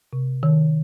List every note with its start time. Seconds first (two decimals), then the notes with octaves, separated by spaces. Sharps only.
0.13 C3
0.43 D#3